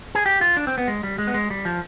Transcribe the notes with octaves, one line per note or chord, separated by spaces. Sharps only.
G#4
G4
F4
D4
C4
B3
G#3
G3
G#3
B3
G#3
G3
F3